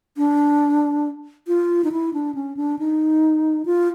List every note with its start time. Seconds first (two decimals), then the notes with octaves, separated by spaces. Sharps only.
0.17 D4
1.48 F4
1.84 D#4
1.92 E4
2.13 D4
2.35 C#4
2.57 D4
2.79 D#4
3.65 F4